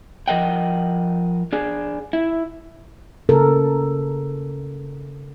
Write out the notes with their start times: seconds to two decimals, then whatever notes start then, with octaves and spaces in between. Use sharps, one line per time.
0.28 F3 A#4 D#5 F#5 G5
1.53 D4 G#4
2.13 E4
3.29 C#3 A4 A#4